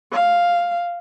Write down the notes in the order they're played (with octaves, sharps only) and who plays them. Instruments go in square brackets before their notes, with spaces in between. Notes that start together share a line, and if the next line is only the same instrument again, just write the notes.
[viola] F5